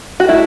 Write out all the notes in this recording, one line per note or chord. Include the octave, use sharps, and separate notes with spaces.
F#4
A3 D#4 E4